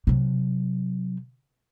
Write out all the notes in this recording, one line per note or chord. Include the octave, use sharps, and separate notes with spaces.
C3 F#3